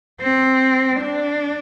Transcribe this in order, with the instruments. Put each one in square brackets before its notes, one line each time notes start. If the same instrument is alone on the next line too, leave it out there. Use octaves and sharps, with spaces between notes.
[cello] C4
D4